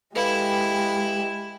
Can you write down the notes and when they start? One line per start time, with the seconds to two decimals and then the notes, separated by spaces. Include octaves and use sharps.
0.15 G#3 E4 G4 A4 B4 F5